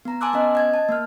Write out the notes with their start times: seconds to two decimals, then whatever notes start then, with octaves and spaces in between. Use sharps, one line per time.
0.05 B3 A#5
0.21 G#5 A5 C6 D6 E6 F#6
0.33 B3 C#4 D#5 F#6
0.55 D#5 G#6
0.74 A5
0.89 A#3 F6